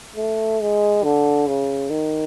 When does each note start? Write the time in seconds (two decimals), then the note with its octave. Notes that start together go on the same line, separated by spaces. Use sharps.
0.16 A3
0.61 G#3
1.04 D3
1.48 C#3
1.90 D#3